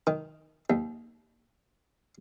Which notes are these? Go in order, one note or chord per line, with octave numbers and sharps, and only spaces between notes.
D#3
D#2